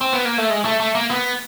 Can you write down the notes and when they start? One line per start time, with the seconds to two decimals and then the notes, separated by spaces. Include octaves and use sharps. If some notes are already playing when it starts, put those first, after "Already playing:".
0.01 C4
0.13 B3
0.25 A#3
0.38 A3
0.50 G#3
0.65 A3
0.80 A3
0.95 A#3
1.11 B3